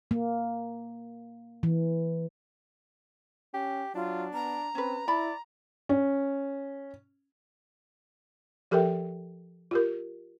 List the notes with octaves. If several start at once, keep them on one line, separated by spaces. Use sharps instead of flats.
A#3
E3
C#4 G4
F#3 D4 F4
B3 A#5
C4 C#4 B4
E4 D5 B5
C#4
F3 G4 A4 A#4 E5 G5
F4 G4 A#4